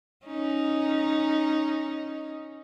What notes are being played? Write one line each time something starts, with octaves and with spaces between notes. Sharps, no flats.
C#4 D#4